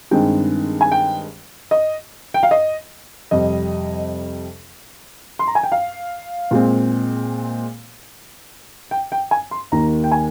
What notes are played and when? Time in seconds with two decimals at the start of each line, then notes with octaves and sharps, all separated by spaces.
0.11 G2 D#3 G#3 C4 G5
0.81 G#5
0.92 G5
1.71 D#5
2.34 G5
2.43 F5
2.51 D#5
3.31 F2 C3 G3 D#5
5.39 C6
5.47 A#5
5.55 G#5
5.63 G5
5.72 F5
6.51 A#2 G#3 C4
8.91 G5
9.12 G5
9.31 G#5
9.51 C6
9.72 D#2 D#3 A#3 A#5
10.04 G5
10.12 G#5